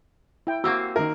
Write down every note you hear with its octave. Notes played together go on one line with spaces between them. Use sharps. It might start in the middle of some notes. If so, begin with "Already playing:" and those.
E4 G5
A#3 C4 F#4 G4 E6
D#3 A#4